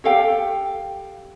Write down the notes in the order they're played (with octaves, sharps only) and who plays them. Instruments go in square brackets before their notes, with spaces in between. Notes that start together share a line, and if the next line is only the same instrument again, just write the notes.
[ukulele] G4 A4 F5 G5